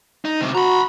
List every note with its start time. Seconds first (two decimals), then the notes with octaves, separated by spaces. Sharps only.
0.25 D#4
0.41 D2 C3
0.55 F#4 A#5 B5